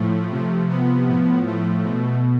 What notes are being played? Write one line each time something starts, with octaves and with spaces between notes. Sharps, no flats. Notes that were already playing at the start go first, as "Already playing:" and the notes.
Already playing: A2 F3 A3
C3 F3
B3
A2 F3
A3
B2